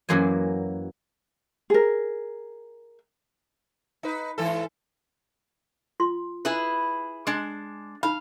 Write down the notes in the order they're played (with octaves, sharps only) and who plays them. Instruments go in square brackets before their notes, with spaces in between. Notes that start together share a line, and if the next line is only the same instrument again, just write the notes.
[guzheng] F#2 E3 F#3 A#3 C5 G#5
[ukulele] G#4 A#4
[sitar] D#4 B4
G#2 E3 A4
[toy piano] F4 C6
[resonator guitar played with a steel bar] E4 G#4 B4
G#3 D4
[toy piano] D#4 B5 [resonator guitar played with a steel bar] F5